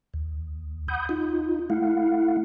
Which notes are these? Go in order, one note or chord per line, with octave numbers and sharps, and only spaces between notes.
D#2
F#5 B5 D#6 G6
D#4 F4
A3 E4 F5 F#5